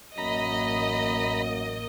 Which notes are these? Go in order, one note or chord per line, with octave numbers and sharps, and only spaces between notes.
A1 F#2 A#3 D#5 A#5 B5